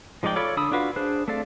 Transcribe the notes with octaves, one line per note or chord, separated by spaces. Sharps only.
F3 G#3 D#4 D5 G5
F4 A4 C#5 D5 B5
D3 D4 B5 D#6 E6
D4 F4 F#4 B4 F5
D4 G#4 C5 F#6
A3 C4 A4 D5 F5